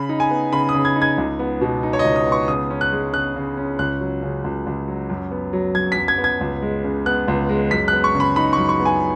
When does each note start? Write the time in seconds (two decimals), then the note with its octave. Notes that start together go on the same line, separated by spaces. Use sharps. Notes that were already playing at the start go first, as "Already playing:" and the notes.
Already playing: C#3 B5
0.09 D#4
0.20 G#5
0.31 B3
0.53 C#3 B5
0.69 D#6
0.74 C#3
0.85 G#6
0.96 D#4
1.02 G#6
1.18 C#2
1.39 B3
1.61 B2
1.83 D#4
1.93 C#5
1.99 D#5
2.05 C#2
2.16 D#6
2.27 B3
2.32 C#6
2.48 C#3 D#6
2.70 C#4
2.81 F#6
2.92 G#3
3.13 C#3 F#6
3.36 C#3
3.57 C#4
3.79 C#2 F#6
4.01 F#3
4.23 C#3
4.44 C#2
4.66 C#2
4.88 F#3
5.10 F#2
5.31 B3
5.53 F#3
5.75 F#2 G#6
5.92 F#2 B6
6.08 G#6
6.18 B3
6.24 G#6
6.41 C#2
6.62 G#3
6.84 C#3
7.06 B3 F#6
7.28 C#2
7.49 G#3
7.71 F#2 B6
7.88 B3 F#6
8.04 C#6
8.15 C#3
8.20 B5
8.36 D#4 B5
8.53 F#2 C#6
8.69 C#6
8.80 B3
8.85 G#5